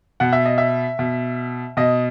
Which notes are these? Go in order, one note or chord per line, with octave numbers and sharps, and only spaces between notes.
B2 F#5
E5
D#5
E5
B2
B2 D#5